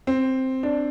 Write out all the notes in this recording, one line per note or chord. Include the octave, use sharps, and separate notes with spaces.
C4
D4